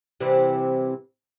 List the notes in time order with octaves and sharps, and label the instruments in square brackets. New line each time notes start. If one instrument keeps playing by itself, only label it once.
[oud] C3 E3 G3